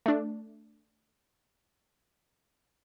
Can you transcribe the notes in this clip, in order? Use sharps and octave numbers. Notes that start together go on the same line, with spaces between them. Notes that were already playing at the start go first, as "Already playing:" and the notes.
A3 D4